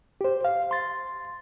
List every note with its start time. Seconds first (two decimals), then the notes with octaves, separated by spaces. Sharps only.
0.21 G4 C5
0.44 F5
0.71 C6 A6